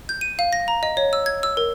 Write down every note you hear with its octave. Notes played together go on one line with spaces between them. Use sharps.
G6
D#7
F5
A#6
A#5
D#5
C#5
E6
G#6
E6
A#4